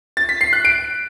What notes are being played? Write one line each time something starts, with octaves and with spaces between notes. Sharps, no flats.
A6
B6
C7
F#6
D7